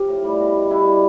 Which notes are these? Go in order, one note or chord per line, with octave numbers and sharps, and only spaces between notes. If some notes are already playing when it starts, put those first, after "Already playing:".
Already playing: F3 F4 G4
A2
G3
B2
B2
G2 E4
G3